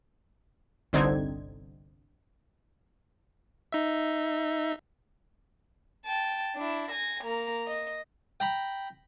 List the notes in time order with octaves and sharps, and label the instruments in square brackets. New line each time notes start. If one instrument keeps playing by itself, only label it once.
[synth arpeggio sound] G1 C2 D3 C4 D#4 G#6
[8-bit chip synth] D#4 E5
[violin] G5 A5
D4 E4
G#5 A#6
A#3 A#5
D#5
[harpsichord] G5 A#5 B5